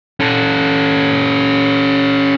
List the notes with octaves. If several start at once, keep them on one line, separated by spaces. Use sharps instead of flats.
C#4 A4